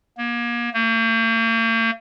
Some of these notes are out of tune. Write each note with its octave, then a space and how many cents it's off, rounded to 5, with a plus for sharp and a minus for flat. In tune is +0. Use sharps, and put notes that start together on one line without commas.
A#3 +35
A#3 -45